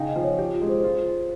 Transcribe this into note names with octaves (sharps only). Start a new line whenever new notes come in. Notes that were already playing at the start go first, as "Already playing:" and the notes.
Already playing: C#3 D#4 F5 G5 G#5
D#5
F3
C#5
F4 G4
F4
G#3
C5
F4